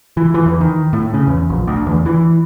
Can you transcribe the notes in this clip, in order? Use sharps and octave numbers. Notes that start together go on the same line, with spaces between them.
E3
E3
E2
D#3
A2
C#3
E2
A#1
D2
E2
E3